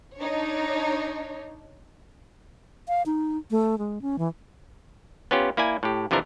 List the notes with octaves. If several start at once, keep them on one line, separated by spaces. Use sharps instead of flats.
D4 D#4 C#5
F5
D#4
A3
G#3
C#4
E3
B3 C#4 F4 G4
A#3 E4 D5 G#5
A2 G4
F2 C3 E3 D4 A#4